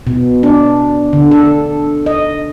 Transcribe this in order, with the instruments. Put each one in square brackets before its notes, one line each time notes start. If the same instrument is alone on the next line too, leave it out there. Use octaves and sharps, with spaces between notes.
[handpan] B2
D4
D3
A4
D#5